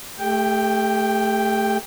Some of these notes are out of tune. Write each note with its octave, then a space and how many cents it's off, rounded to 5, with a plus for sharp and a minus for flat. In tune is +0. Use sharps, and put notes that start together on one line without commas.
A3 +0 G4 +35 G5 +0